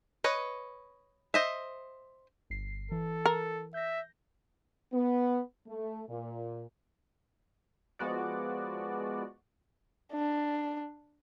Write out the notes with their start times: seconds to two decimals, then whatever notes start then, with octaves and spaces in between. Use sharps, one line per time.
0.24 B4 C#5 D#5
1.34 C5 D#5 E5
2.50 G1 C7
2.92 E3 A4
3.26 A#4
3.74 E5 G6 A#6
4.93 B3
5.67 A3
6.10 A#2
7.99 F3 G#3 B3 F#4 D5
10.12 D4